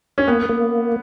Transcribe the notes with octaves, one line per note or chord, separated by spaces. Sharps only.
C#4
A#3 B3
A#3